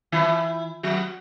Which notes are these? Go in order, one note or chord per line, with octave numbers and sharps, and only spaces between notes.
E3 E4
F#3 F#4